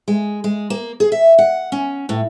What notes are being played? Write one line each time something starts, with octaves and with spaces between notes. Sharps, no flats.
G#3
G#3
A#3
G#4
E5
F#5
C#4
A2